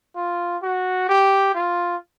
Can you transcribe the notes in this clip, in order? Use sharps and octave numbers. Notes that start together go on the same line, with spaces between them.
F4
F#4
G4
F4